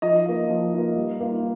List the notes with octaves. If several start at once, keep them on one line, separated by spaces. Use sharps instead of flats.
F3 D#5
A#3 F4
F3
A#3 F4
G3
A#3 F4